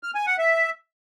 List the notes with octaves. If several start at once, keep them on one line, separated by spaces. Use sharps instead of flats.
F6
G#5
F#5
E5